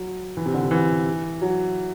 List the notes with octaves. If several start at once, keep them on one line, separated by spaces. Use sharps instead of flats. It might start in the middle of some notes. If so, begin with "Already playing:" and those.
Already playing: F#3
E3
C3
D3
C3
E3
F#3